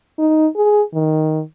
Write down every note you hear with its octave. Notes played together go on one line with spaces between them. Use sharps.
D#4
G#4
D#3